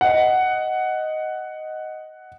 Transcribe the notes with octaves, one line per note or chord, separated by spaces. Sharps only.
D#5 F#5